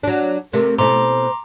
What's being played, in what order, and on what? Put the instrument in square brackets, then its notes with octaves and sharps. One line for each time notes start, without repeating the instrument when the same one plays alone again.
[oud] F#3 D4
[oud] C3 A3 [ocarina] A#4
[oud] B2 A3 E4 [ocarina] C5 [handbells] A#5 C6 D6